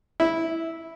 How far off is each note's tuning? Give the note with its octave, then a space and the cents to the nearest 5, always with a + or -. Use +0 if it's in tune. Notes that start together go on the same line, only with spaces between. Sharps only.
E4 -10